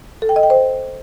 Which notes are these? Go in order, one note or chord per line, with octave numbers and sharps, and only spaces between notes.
A4
G5
D#5
G5
C5